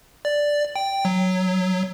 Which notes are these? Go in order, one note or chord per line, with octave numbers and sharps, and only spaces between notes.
D5
G5
F#3